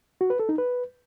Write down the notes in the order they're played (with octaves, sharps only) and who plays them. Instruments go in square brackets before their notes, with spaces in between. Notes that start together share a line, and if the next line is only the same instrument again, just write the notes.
[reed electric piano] F#4
B4
A4
D#4
B4